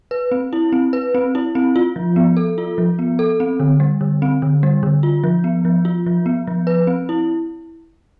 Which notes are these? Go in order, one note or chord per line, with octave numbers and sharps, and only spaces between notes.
B4
C4
E4
C4
B4
C4
E4
C4
F4
F3
B3
A4
F4
F3
B3
A4
C4
D3
G3
D3
C4
D3
G3
D3
F4
F3
B3
F3
F4
F3
B3
F3
B4
C4
E4